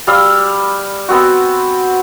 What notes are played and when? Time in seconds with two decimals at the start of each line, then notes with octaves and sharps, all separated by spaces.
0.07 G3 F5 E6
1.08 B3 C4 F#4